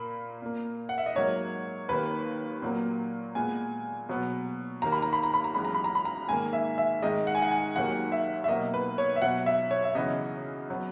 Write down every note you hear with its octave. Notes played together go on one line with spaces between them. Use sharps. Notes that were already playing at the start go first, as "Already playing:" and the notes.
Already playing: A#2 A#3 B5
A#2 A#3
F#5
E5
D#5
G#2 F#3 A#3 C#5
D#2 D#3 A#3 B4
A#2 F#3 A#3
A#2 G#3 B3 G#5
B2 F#3 B3
D#2 D#3 A#3 A#5
B5
A#5
B5
A#5
B5
A#5
F#2 E3 G#3 B3 B5
A#5
B5
A#5
B5
A#5
G#2 D#3 A#3 G#5
E5
E5
G#2 D#3 G#3 D#5
F#5
G#5
F#5
G#5
D#2 D#3 F#3 A#3 F#5
E5
E5
B2 F#3 A#3 D#5
B4
C#5
E5
B2 F#3 B3 F#5
E5
C#5
E5
F#2 C#3 E3 B3 D#5
F#3 B3